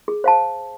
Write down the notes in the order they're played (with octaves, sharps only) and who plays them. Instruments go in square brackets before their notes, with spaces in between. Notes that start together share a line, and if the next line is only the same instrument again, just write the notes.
[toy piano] G#4
C5 F5 A5